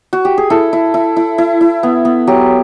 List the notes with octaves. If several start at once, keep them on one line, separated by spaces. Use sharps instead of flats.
F#4
G4
G#4
E4 A4
E4
E4
E4
E4
E4
B3
B3
F#3 G4